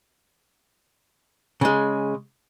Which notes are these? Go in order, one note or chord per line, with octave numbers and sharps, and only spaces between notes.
C#3 G#3